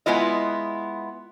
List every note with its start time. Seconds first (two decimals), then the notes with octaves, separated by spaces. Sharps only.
0.06 G#3 B3 E4 F4 D#5